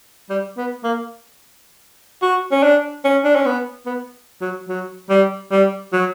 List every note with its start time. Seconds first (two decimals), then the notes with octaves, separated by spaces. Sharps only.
0.30 G3
0.57 B3
0.84 A#3
2.22 F#4
2.51 C#4
2.63 D4
3.05 C#4
3.24 D4
3.36 C#4
3.46 B3
3.86 B3
4.41 F#3
4.69 F#3
5.09 G3
5.51 G3
5.93 F#3